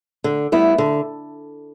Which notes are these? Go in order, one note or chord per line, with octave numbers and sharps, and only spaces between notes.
D3
G3 B3 E4
D3